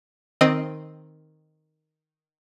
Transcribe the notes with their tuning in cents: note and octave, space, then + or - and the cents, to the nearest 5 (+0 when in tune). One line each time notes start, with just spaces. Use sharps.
D#3 +0 C4 +0 D#5 -10